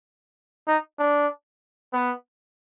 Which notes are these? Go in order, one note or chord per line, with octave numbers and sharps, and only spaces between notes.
D#4
D4
B3